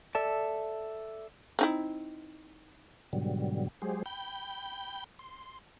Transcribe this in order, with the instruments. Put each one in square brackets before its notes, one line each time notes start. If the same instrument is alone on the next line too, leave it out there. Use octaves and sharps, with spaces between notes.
[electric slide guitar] A4 D5 E5 A5
[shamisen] C4 D#4 E4
[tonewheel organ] G#2 B2 D3 F#3 G3
F#3 G#3 G4 G#4 C5
G5 B5 G6
C6